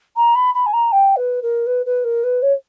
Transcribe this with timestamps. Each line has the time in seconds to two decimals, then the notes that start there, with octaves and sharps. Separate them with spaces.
0.16 A#5
0.35 B5
0.54 B5
0.66 G#5
0.73 A#5
0.92 G5
1.16 B4
1.42 A#4
1.66 B4
1.86 B4
2.04 A#4
2.23 B4
2.42 C#5